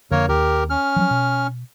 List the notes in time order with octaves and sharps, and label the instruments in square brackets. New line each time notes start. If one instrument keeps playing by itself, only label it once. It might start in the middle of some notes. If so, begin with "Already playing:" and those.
[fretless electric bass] F2 D3 [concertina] A#3 A#4 C#5
[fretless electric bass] D#2 [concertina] G4 A#4
[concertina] C#4 F6
[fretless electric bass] F3 F#3
B2